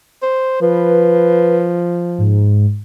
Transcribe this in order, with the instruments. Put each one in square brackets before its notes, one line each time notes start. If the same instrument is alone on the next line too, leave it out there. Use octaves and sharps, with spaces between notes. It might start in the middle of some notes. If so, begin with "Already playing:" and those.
[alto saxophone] C5
[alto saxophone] F3 [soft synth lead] B4
[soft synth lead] G#2